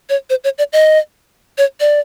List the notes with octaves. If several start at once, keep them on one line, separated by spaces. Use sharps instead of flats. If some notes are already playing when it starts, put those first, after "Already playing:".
C#5
C5
C#5
D5
D#5
C#5
D5